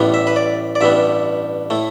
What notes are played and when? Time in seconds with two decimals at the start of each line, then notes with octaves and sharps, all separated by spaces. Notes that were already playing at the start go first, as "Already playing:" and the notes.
Already playing: A1 A2 G3 B3
0.14 E5
0.27 B4
0.36 D5
0.75 D5
0.81 A1 G2 G3 B3 E5
1.70 A2 A3